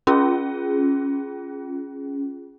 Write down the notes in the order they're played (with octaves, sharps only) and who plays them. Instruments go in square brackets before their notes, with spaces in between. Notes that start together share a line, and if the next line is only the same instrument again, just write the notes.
[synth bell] C#4 F4 G#4